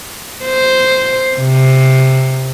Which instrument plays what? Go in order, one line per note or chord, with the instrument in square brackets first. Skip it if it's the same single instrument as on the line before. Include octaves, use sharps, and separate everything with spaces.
[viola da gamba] C5
C3